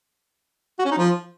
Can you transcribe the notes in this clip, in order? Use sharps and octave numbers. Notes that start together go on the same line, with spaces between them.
F#4
C#4
D#4
F3